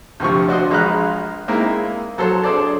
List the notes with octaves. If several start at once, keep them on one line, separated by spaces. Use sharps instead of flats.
D2 C3 F3 C#6
D4 F#4 C5 D#5
A#1 G#3 F5 A#5 B5 F#6
G#3 A#3 C4 D#4 E4 A#4
F#3 A4 C5 A5
D4 G#4 A4 C5 D5 A5